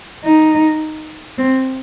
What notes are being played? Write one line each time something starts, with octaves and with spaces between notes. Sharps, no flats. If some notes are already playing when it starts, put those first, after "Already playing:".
D#4
C4